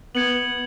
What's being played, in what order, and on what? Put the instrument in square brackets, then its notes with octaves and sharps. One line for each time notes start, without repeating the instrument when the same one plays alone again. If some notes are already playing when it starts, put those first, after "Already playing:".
[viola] B3 [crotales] G#6 C#7 F#7